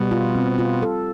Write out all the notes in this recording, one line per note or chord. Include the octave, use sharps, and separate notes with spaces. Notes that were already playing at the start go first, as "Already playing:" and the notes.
Already playing: B2 G3
F4
C4
F4
A4